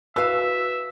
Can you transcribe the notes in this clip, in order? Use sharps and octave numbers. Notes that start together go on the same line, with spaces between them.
F#4 B4 E5 F5 E6